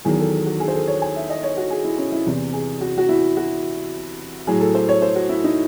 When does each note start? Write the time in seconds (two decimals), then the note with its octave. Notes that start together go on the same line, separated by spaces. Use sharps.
0.05 E2 D#3 F#3 G#4
0.19 A4
0.46 F#4
0.60 G#4
0.68 C5
0.74 A4
0.87 C#5
1.02 G#5
1.16 E5
1.30 D#5
1.43 C#5
1.57 F#4
1.70 G#4
1.85 E4
1.98 C#4
2.12 E4
2.26 E2 C3 E3
2.53 G#4
2.81 F#4
2.98 F#4
3.09 E4
3.37 F#4
4.47 A2 F#3 G#4
4.61 A4
4.75 C5
4.89 C#5
5.02 C5
5.16 F#4
5.29 E4
5.44 D#4